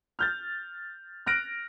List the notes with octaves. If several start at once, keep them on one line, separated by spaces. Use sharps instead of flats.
F6 G6 A6
F6 F#6 A#6 D7